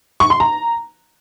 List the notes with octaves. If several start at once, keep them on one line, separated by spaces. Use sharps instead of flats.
C#6
C6
A#5